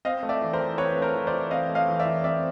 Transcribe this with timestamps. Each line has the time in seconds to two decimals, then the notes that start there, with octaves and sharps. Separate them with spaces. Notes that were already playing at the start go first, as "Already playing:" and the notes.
0.05 C4 D#5 F5
0.23 A3
0.29 D5 E5
0.42 E3
0.53 A#4 C5
0.59 E3
0.78 C4 B4 C#5
0.97 A3
1.02 A#4 C5
1.15 E3
1.27 C5 D5
1.33 E3
1.51 C4 D#5 F5
1.69 A3
1.75 D#5 F5
1.88 E3
1.99 D5 E5
2.05 E3
2.24 C4 D5 E5